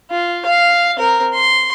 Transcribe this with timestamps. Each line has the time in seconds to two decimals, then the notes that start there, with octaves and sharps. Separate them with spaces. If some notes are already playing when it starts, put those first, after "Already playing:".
0.11 F4
0.45 F5
0.97 C4 A#4
1.33 C6